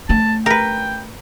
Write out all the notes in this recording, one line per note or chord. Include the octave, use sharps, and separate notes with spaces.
A3 C#4 A5
A#4 B4 G5